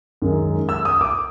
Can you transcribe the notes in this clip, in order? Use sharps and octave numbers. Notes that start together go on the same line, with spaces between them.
F#2 D#3 G#3
E6
D#6
D6